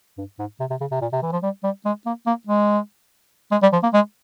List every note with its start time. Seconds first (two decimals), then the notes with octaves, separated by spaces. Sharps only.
0.18 G2
0.39 G#2
0.60 C3
0.70 C3
0.81 C#3
0.91 C3
1.01 A#2
1.12 C3
1.22 E3
1.32 F3
1.43 G3
1.64 G3
1.85 G#3
2.06 A#3
2.27 A#3
2.47 G#3
3.51 G#3
3.62 G3
3.73 F3
3.83 A#3
3.93 G#3